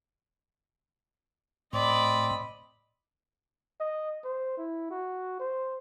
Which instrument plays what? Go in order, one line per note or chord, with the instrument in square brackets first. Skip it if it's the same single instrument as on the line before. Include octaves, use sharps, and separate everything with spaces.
[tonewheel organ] A2 [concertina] C4 [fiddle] D5 [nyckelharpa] D#5 B5
[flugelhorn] D#5
C5
E4
F#4
C5